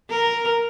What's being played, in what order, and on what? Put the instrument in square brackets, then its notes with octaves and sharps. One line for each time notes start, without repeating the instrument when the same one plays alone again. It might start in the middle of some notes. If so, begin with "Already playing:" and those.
[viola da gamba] A#4